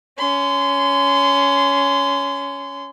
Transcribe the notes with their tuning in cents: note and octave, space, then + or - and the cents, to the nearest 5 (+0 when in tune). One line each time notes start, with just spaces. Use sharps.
C#4 +15 C6 -25